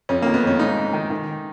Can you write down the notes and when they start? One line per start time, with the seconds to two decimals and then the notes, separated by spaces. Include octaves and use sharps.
0.09 F2 C#4
0.22 D#3 A#3
0.34 B3
0.43 F2 C#4
0.59 G#2 D#4
0.77 G#2
0.93 D#3
1.10 D#3